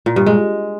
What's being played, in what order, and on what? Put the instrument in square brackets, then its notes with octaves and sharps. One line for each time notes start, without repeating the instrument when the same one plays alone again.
[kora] A#2
G2
G#3